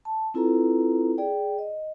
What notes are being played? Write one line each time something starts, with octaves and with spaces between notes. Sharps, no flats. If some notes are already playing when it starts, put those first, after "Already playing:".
A5
C4 E4 F4 A4 B4 A#5
G#4 D5 G5
D#5